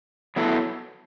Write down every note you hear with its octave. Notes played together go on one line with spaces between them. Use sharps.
F#3 B3 E4 A4